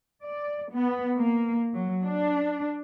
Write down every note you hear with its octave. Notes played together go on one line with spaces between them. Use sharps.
D5
B3
A#3
F#3
D4